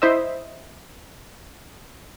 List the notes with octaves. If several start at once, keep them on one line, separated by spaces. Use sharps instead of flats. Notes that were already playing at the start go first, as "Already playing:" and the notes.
E4 C5 D#5 E5